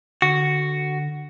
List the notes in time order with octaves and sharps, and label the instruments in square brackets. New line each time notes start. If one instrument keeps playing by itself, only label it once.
[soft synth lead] D3 [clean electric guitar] F#4